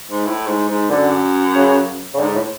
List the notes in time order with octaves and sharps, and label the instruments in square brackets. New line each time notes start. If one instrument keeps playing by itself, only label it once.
[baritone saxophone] G#2
A2
G#2
G#2
[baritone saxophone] F#2 [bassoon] D3
[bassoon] C#3
C#3
[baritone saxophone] G#2 [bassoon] D3
[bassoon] A2